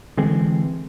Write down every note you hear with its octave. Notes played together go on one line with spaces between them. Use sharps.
D3 E3 G#3 C4